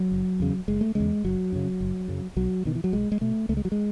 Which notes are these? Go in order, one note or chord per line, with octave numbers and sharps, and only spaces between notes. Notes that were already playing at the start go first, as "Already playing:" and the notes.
Already playing: F#3
F#1
E2 C#3
F#1 G#3
A3
E2 C#3 G#3
F#1 F#3
F#2 C#3
F#1
F#2 C#3
B1 F#3
B2 D#3
E3
F#3
B1 G#3
G#3
B2 A3
C#2 A3
G#3
F#3
G#3